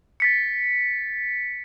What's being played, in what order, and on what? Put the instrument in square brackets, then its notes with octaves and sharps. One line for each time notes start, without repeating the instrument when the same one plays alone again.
[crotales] A6 B6 C#7